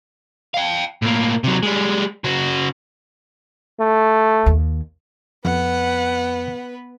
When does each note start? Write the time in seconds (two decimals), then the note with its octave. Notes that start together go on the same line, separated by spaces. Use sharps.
0.54 F5 G5
1.02 A2 A#3
1.44 C3 F#3
1.63 G3 G#3
2.24 C#3 F#4
3.80 A3
4.46 D#2
5.45 F2 B3 B4 F#5